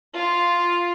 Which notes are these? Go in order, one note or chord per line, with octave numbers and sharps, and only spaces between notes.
F4